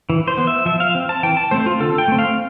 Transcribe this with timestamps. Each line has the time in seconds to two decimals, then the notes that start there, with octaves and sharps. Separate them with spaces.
0.10 E3
0.28 C5
0.38 B3
0.47 E5
0.66 F3 E5
0.80 F5
0.95 C4
1.09 A5
1.23 E3 G5
1.37 A5
1.51 A3 C4 C5
1.66 F4
1.80 D3 A4
1.98 G5
2.08 A3 C4
2.19 F5